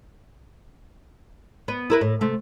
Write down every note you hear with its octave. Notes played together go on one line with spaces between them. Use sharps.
B3
E4 A#4 B4
A2
C3 A3